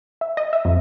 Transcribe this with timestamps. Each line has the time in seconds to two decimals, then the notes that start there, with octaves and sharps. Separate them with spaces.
0.21 E5
0.37 D#5
0.53 E5
0.65 F2